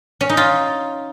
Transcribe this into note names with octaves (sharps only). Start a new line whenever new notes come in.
C#4
D#4
F4